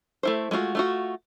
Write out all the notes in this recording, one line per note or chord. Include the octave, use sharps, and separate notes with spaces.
A3 E4 C5
G#3 A3 F4 F#4
A3 F4 F#4